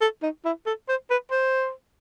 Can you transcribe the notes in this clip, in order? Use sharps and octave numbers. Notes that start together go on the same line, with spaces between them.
A4
D#4
E4
A4
C5
B4
C5